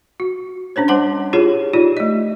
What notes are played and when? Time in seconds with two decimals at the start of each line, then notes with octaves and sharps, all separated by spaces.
0.20 F#4
0.76 C#4 D4 C5 C#5
0.88 G3 C5 F#5 A5 C6
1.33 E4 F4 G4 G#4 C#5
1.73 D#4 F4 G4 D5
1.97 A3 D#5